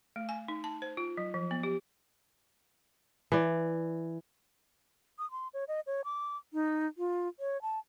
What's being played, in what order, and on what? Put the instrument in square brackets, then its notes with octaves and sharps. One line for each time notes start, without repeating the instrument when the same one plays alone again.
[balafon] A3
G#5
D#4
A5
C5
F4
F#3
F3
B3
G4
[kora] E3 D5
[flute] D#6
C6
C#5
D#5
C#5
D6
D#4
F4
C#5
A5